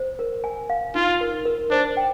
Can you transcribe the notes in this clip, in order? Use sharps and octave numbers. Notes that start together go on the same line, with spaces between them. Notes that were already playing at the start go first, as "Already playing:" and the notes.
Already playing: C5
A#4
G#5
F5
D#4 F4
A#4
A#4
D4 C5
G5